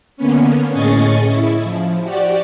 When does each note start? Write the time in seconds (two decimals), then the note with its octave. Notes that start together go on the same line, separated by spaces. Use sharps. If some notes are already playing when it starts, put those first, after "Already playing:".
0.17 D3 A#3 B3 C#4
0.73 A2 C#4 G#4 D#5 C#6 A6
1.28 E4
1.63 F3
2.02 F#4 G4 D5